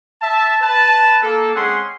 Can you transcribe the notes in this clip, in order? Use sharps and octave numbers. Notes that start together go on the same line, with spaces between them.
E5 A5
B4 A5
A#3 A4
G#3 C4 C#4 G#4 F#5 C6